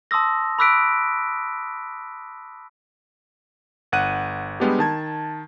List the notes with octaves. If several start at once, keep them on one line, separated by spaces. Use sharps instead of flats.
A5 C6 D#6 E6 A#6
B5 D6 E6 F#6 B6 D7
G1 F#5 F#6 D#7
G3 G#3 B3 D4 G4
D#3 A5 G#6